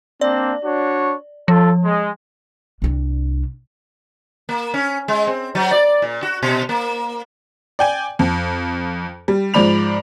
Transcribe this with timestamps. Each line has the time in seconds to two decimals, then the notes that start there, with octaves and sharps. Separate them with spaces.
0.21 A#3 C4 D4 D5
0.64 D4 F#4 C#5
1.48 F3 F4 A4
1.84 G#3
2.82 C2 D4
4.49 A#3
4.74 C#4
5.08 G#3
5.27 C4
5.55 F#3
5.71 D5
6.02 A#2
6.23 F#4
6.43 B2
6.69 A#3
7.79 D5 G5 G#5
8.19 F2
9.28 G3
9.54 G#2 F3 D5 B5 F7